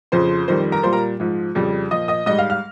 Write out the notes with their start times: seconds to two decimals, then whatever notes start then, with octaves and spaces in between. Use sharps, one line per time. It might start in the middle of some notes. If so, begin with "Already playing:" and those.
0.12 F2 C#3 F3 C5 C6
0.48 F2 D#3 G3 C5 C6
0.72 A#4 A#5
0.83 A#2 G3 C5 C6
0.93 A#4 A#5
1.20 G#2 F3
1.55 F2 C#3 G3
1.91 A#2 F3 D#5 D#6
2.08 D#5 D#6
2.26 G#2 G3 D#5 D#6
2.38 F5 F6
2.50 F5 F6